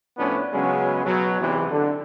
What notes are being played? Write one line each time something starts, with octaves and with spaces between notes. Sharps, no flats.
A2 F3 B3 C#4 D4
C#3 F#3 G#3 B3 C#4
B2 F#3
E2 G#2 C3 E3
D3